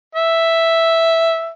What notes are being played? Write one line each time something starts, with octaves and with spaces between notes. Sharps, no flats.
E5